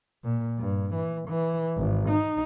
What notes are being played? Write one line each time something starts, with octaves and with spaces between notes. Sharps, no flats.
A#2
G2
E3
E3
G#1
D#4